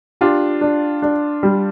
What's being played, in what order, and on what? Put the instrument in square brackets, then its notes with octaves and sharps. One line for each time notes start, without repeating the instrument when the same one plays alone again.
[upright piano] D4 F4 [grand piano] G4
[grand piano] D4
D4
G3